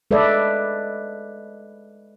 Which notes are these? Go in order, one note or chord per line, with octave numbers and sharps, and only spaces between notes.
G#3 A4 B4 D5 E5